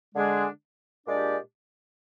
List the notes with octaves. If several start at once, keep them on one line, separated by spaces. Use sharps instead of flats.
D3 G#3 D4 G#4
A#2 G#3 D4 G4 D5